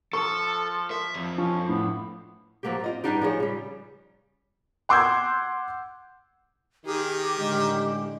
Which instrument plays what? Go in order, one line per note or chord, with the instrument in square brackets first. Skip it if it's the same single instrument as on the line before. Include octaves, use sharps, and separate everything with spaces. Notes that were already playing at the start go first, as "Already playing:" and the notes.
[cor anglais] F3 [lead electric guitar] A4 A5 [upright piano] C#6
[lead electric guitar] E5
F2
[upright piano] F3 [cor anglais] C#4
[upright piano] A2 [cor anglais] B3
[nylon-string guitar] F3 F#3 A#3 F#4 G4
C4 F4 D#5
G2 A3 B3 D4 D#4 G4
F3 G#4 C5 C#5
C#3 G3
[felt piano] F#5 C6 D6 E6 G6 G#6
[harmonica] D#3 [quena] G4 [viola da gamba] G#4
[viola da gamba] A2 D3 [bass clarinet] G#3